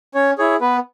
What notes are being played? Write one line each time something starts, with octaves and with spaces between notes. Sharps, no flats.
C#4 C#5
E4 G#4 C#5
B3 B4